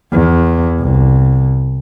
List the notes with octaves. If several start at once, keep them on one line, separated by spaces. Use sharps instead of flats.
E2
C2